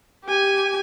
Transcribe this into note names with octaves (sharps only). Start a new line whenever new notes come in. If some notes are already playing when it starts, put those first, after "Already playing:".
G4 G#5